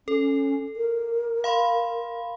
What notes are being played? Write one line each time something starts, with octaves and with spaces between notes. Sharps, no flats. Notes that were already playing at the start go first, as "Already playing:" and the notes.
C#4 A4
A#4
F5 B5 C6